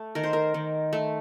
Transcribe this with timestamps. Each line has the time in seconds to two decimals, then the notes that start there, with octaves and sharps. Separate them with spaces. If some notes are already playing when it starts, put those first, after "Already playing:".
Already playing: A3
0.15 D#3 A#4
0.24 C5
0.33 A#4
0.54 D#3
0.93 A3